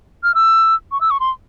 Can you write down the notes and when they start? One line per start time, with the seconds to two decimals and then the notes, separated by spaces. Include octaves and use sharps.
0.23 F6
0.35 E6
0.92 C#6
1.01 E6
1.11 C#6
1.20 C6